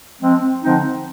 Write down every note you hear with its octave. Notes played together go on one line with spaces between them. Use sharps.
F3 G#3 C4
D3 F3 G#3 C4 D#4